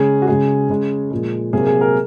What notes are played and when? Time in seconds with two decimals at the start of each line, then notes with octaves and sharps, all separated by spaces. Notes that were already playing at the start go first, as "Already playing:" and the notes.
Already playing: C#3 G#3 G#4
0.22 F#4
0.27 C#3 G#3 G#4
0.70 C#3 G#3
1.11 A#2 F3 G#3
1.53 C3 F#3 A#3 G#4
1.67 G#4
1.81 A#4